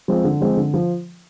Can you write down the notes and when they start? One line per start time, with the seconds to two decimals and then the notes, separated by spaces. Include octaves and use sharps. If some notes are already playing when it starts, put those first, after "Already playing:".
0.08 F3 G#3 C4
0.24 D3
0.41 F3 G#3 C4
0.57 D3
0.74 F3